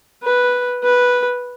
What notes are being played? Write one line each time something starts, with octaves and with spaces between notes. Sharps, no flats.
B4
B4